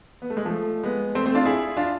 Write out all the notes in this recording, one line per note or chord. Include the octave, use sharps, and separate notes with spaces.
B3
A3
G#3
F3 A3
G#3 B3
A3 C4
A3 C4
D4 F4
E4 G#4
D4 F4